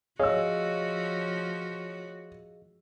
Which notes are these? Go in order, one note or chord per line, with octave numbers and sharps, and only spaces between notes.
F3 F#4 G#4 C#5 D#5 F5 E6